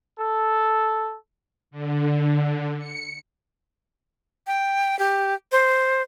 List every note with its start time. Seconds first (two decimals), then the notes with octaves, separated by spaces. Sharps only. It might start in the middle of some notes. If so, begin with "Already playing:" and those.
0.19 A4
1.71 D3
2.79 C#7
4.47 G5
4.99 G4
5.52 C5